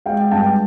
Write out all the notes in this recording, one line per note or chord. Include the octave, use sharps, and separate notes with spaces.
G#3 F5 G5
G2 G5 A5